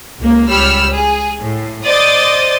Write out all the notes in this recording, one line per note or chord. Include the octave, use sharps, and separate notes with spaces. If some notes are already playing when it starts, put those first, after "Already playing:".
C#2 A#3
C#2 G3 C#5 B5 E6 F6
G#4
A2
C5 D5 D#5 D#6 A6